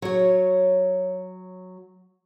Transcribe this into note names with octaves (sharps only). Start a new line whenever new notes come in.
F#3 C#5